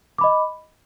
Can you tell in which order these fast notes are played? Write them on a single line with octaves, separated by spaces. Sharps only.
D6 B5 D#5